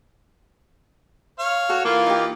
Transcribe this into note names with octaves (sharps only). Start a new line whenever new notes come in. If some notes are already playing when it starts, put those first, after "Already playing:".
C#5 F5
F#4 A4
E3 A#3 F4
D#4 G4